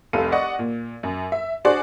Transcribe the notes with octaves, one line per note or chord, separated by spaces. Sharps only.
F1 C2 A4 F5 D#7
D5 D#5 F#5 C#6
A#2
F#2
E5
D4 F#4 G#4 C5 D5